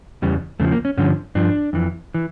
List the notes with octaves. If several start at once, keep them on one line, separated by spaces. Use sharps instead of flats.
E2 C#3 G3
E2 C#3 F3 A3
A#3
C#4
G2 D3 F3 C#4
G2 F3 D4
F2 E3
E3